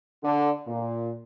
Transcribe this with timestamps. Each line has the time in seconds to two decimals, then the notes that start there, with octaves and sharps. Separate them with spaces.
0.24 D3
0.67 A#2